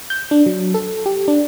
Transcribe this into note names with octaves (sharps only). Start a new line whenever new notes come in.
G6
D4
F#3
A4
G4
D4